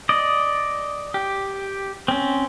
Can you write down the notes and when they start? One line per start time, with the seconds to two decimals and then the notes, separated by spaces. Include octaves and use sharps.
0.09 D5 D#5
1.14 G4
2.08 C4 C#4